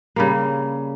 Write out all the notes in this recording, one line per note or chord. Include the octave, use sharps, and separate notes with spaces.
C#3 G3 A#3